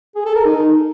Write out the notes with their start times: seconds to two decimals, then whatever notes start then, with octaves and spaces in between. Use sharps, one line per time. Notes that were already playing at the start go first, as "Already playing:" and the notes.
0.16 G#4
0.26 A4
0.36 A#4
0.45 D#4